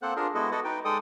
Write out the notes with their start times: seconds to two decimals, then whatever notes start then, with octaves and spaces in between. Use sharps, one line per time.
0.02 A#3 C4 A4 C5 F#5 F#6
0.16 D4 F4 G#4 A#4
0.35 G#3 B3 E4 F#4 A4 D#5
0.51 F#4 A4 B4 D5 D#5 F#5
0.64 D#4 B4 G5
0.85 G#3 A4 D5 G5 D#6